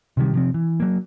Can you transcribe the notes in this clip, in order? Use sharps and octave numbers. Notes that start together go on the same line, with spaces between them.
C3 D#3 G3
C3 F3 C4
E3
F#3 A#3